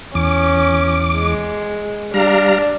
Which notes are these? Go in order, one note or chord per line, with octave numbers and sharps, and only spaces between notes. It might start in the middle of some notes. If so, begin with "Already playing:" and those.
E2 C#4 D6
G#3
G3 D4 F5 A#5